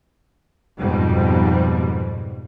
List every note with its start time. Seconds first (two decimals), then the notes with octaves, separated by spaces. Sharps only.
0.78 F2 G#2 B2 G3